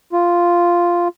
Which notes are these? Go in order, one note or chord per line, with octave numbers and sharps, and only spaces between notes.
F4